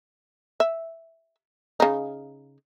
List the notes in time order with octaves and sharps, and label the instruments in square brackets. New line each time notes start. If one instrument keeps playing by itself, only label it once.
[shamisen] E5
C#3 D#4